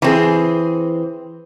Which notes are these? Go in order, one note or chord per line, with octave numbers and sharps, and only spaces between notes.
E3 C4 G#4